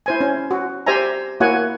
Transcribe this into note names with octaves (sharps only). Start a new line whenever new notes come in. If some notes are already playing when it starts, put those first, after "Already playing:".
E4 C5 G#5
C#4
F#4
G4 C5 D5 E5 G#5 A#5
A#3 E4 F#4 C#5 F#5 G#5